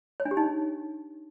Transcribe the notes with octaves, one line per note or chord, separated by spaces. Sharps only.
C#5
D4
G4
D#4